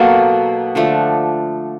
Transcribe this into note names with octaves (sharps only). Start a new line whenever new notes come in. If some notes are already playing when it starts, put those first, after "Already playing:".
Already playing: B2 F#3 A#3 A4
D3 F3 A3 D4